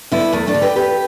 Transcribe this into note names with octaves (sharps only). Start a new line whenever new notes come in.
D3 B3 E4
E2 A3
A3 D4
D3
G4 B4
E2 G4 B4